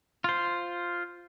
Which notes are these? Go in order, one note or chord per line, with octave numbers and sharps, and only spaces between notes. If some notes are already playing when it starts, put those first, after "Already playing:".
F4 C5